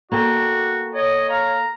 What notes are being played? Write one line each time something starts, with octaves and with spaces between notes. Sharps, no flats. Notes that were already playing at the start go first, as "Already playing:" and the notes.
A#3 F#4 A4 D5 G5
C#5 D#5
F5 A#5